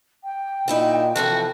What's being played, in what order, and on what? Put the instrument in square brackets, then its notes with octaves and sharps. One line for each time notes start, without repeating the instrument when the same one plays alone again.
[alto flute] G5
[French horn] A#2 [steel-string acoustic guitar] D#4 E4 F#4
[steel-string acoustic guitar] C3 E3 F3 [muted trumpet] F#4 [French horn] A4